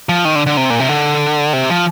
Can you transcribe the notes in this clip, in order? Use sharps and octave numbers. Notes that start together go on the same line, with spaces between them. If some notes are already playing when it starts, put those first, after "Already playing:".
F3
D#3
D3
D3
C3
A#2
C3
D3
C3
F3